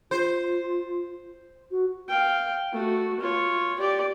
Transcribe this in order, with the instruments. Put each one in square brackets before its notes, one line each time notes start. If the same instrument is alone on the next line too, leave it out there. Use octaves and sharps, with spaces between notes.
[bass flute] F4 [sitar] C5
[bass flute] F#4
[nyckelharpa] F5 G5
A3 F#4
F4 C#5
G4 D5